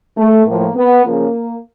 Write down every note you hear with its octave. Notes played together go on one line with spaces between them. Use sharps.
A3
A2 F3 A#3
B3
C#3 F3 A#3